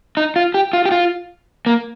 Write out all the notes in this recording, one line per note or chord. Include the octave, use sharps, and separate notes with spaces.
D#4
F4
G4
F4
G4
F4
A#3